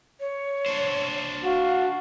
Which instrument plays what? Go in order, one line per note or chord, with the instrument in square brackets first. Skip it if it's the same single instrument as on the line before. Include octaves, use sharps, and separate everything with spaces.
[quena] C#5
[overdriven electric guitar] D4 C5
[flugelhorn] F#4 [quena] F5